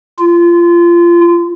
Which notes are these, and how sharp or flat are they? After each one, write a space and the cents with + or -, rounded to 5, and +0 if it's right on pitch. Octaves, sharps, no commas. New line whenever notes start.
F4 -25